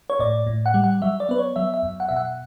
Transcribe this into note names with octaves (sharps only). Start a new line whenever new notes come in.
C#5
A2 D5
A2
F#5
G3
F#5
F#3 E5
D5
B3 B4
C#5
F#3 E5
E5
F#2
F#5
B2 E5
F#5